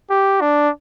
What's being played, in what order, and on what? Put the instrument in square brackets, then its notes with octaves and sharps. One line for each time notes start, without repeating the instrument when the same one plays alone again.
[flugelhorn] G4
D4